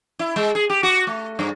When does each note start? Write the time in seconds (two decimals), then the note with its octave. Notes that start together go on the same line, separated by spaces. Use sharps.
0.19 E4
0.36 G#3
0.55 G#4
0.70 G4
0.83 F#4
1.07 A3
1.39 G2